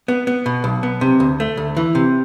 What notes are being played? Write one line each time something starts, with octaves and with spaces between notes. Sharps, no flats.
B3
B3
B2
B1
B3
C3
D2
A3
D2
E3
C3